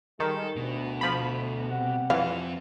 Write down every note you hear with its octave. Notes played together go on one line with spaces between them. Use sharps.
D#3 G3 G#3 A4
D2 B2
F3 B5
C3 G3 F#5
E3 F3 C4 F5